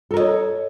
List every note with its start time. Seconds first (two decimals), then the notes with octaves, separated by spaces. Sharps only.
0.11 A4
0.14 A#4
0.17 D#5
0.20 C#5